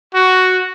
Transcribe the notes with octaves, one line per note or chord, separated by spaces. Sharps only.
F#4